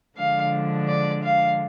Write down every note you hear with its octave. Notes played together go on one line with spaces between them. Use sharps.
D3 F3 G#3 D4 F5
D5
F5